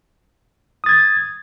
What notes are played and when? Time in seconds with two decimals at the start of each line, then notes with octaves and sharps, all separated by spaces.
0.84 D#6
0.86 A6
0.89 G#6